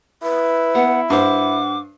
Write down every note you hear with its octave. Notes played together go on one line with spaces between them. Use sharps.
E4 B4
B3 F#5
G2 C5 F#5 D6